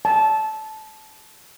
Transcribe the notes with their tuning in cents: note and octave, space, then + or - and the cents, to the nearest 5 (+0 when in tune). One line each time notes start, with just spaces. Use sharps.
A5 -15